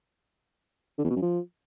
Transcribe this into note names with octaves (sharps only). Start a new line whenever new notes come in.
D3
E2
B2
F#2
F3